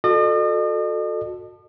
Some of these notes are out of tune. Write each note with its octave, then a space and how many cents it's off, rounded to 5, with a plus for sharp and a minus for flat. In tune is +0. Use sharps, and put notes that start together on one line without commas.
F#4 -30 A4 +0 D#5 -45